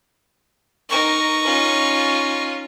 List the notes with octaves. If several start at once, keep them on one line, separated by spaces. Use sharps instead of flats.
D#4 A#4 C#6
C#4 F4